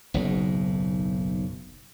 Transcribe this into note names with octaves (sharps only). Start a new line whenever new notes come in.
F#1 B1 G#2